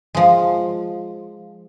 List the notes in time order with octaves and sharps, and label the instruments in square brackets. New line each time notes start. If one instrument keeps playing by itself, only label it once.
[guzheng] F3 G#3